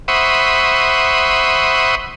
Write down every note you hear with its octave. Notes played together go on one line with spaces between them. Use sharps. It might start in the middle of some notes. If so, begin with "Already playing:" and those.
C5 E5 F#5 B5 C#6 D#6